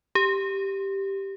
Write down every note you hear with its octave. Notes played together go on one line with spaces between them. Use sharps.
G4